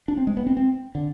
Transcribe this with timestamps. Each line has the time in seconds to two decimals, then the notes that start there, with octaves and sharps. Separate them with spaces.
0.08 D4
0.17 C4
0.27 G#3
0.37 B3
0.47 C4
0.57 C4
0.95 D3